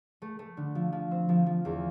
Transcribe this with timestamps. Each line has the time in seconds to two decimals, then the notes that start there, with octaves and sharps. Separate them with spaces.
0.22 A3
0.39 A3
0.57 D3
0.75 F3
0.92 F3
1.11 C4
1.29 F3
1.46 F3
1.65 E2